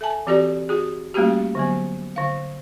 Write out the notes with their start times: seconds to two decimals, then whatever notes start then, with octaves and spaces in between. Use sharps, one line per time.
0.01 A4 E5 G#5 A5
0.27 E3 C4 F#4 G4 A4 D5
0.69 F#4 G#4
1.14 G3 A3 A#3 C#4 F#4 G4
1.55 D3 F#3 B3
2.16 D3 F5